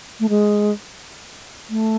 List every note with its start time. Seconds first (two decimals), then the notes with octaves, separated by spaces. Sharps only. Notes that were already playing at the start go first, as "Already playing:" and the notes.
0.20 A3
0.29 G#3
1.70 A3